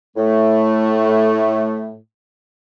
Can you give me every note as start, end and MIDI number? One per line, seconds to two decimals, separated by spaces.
0.17 1.95 45
0.17 1.95 57